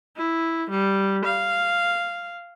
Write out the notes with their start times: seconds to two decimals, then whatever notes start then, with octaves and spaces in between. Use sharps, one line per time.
0.16 E4
0.70 G3
1.25 F5